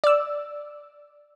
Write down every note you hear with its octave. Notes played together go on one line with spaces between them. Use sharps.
D5 E6